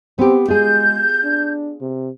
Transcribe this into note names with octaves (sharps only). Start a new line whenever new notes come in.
B3 C4 G4
G#3 F4 G#4 G6
D4
C3